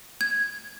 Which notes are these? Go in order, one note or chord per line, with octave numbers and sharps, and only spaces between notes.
G#6